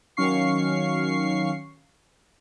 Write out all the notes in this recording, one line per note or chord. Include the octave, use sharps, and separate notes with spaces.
D#3 F#3 C#4 F5 C#6 C7